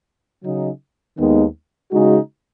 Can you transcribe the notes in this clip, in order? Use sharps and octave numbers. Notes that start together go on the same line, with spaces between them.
C#3 F#3 D#4
D#2 D#3 G#3 B3 D#4
C#3 G#3 D#4 F#4